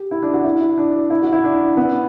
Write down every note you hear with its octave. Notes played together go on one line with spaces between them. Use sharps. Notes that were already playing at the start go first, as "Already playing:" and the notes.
Already playing: G4
E4
D4
F#4
E4
D4
E4
F#4
E4
D4
B3